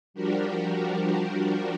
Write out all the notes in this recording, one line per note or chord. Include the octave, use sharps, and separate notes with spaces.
F3 G3 D4 F#4 G4 A#4